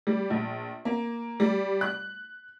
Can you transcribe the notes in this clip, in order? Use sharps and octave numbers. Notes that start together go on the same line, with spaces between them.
G3
A#1
A#3
G3
F#6